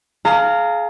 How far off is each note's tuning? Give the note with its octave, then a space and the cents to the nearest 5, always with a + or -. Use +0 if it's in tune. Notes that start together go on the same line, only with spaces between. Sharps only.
G#4 +30 F5 +0 A#5 -25